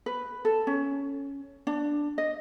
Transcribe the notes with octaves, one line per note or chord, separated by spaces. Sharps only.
B4
A4
C#4
D4
D#5